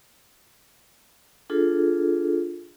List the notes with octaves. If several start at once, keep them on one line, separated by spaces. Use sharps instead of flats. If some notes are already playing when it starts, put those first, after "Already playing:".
D4 F4 G#4 A4